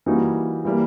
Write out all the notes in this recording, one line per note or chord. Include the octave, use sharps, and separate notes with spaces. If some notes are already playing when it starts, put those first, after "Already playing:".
E3 G3 A#3 D#4 F#4
E3 G3 A#3